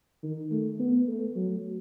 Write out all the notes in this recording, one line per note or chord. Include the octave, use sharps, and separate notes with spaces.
D#3
A3
B3
A3
F#3